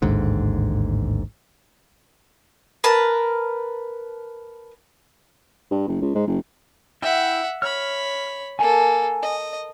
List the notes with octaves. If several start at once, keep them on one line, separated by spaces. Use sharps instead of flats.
A1 D#2 G#2 D3
A#4 B4 A5
G2
F#1
C#2
G#2
F#1
E4 E5 F#5 G5
C#5 B5 F6
A#3 A4 G#5
D#5